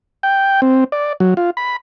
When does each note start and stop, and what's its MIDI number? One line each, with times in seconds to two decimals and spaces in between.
0.23 0.61 79
0.62 0.84 60
0.92 1.13 74
1.20 1.34 54
1.37 1.50 65
1.57 1.76 83